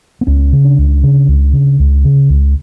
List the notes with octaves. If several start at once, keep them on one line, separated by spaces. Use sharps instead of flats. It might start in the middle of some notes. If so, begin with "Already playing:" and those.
B3
C#2 C#4
C#3
D4
C#2
C#3
C#2
C#3
C#2
C#3
C#2